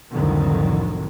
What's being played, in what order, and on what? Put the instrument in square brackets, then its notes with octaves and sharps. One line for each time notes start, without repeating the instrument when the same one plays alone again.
[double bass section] C2 F2 A2 D3 D#3 F#3